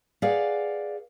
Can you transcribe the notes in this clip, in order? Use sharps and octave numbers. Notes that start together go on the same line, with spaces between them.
G#4 B4 D5 F5 F#5